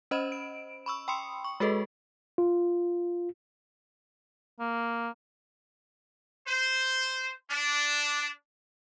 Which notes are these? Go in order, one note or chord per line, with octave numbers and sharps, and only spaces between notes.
C#4 C5 D#5 B5 E7
D7
B5 C#6 E6
G5 B5 C6 D#6 C#7
C#6
G#3 F#4 G#4 A4 B4 D#5
F4
A#3
C5
D4